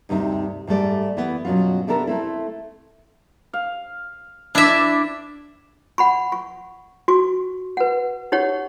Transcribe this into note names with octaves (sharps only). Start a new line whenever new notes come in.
D2 G2 C3 D#4
G#2 G3 A3 D5
E3 B3
G2 B2 F#3 C#4 F4
C3 B3 D4 A4 A#4
A3 C4 E4
F5
D4 E4 D5 E5
F#5 B5 C#6
C#6
F#4 C#6
B4 F#5
D#4 G4 C#5 F#5